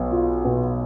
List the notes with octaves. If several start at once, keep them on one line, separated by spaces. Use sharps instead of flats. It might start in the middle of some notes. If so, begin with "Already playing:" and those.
Already playing: B1 B3
F4
B2